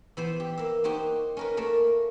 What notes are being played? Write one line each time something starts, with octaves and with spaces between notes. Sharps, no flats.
E3 B3 C5
G4
A#3 E5
A#3 D#4 F#4 G4 C5
C#4 A#4 B4
A3 A#3 A#4